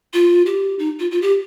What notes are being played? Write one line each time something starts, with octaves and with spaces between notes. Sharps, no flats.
F4
G4
D#4
F4
F4
G4